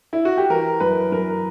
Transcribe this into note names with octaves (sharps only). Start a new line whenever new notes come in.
E4
F#4
G4
E3 A#4
F#2 B4
F#2 A#4